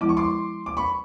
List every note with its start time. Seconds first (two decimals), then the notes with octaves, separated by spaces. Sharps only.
0.01 F3 G#3 B3 E4 D6
0.09 C#6
0.17 C6 D6
0.66 D6
0.77 B5 C#6